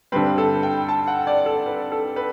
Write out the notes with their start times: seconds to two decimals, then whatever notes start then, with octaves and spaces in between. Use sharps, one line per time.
0.12 G2 D3 G3 C4 B4
0.38 A4
0.63 G5
0.89 A5
1.07 F#5
1.27 D5
1.46 A4
1.66 B4
1.92 A4
2.16 B4